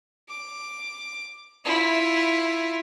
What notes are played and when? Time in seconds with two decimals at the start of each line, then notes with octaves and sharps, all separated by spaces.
0.29 D6
1.65 E4 F4